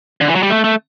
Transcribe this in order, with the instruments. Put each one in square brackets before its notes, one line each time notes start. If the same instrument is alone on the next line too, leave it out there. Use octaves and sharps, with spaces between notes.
[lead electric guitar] D3
E3
F#3
G3
A3
A3